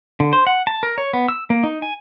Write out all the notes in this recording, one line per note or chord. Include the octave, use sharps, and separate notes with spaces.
D3
C5
F#5
A5
A#4
C#5
B3
E6
A#3
D#4
G#5